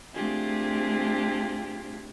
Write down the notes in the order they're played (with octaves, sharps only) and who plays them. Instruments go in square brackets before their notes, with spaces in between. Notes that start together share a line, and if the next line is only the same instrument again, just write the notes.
[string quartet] A3 C4 D4 F4 G4 G#4